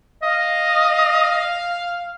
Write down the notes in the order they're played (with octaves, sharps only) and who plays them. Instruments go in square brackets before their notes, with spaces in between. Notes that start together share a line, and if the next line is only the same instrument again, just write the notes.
[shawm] D#5 [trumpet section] F5